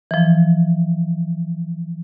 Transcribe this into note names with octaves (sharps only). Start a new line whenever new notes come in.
E3 F3